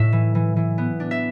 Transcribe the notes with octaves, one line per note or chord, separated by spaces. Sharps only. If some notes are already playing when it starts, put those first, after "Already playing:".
Already playing: A2 E5
E3
E3
E3
B3
D4
E5